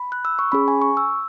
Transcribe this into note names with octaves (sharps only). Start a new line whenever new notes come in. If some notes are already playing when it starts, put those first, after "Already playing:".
Already playing: B5
F#6
E6
C#6
C#4 G#4 B5
G#5
C#6
E6